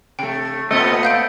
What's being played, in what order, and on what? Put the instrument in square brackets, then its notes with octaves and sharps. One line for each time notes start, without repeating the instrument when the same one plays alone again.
[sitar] C3 A3 [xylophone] G5
[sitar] A#2 C4 D#5 [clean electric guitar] A3 B3
[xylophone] F5 G6 D7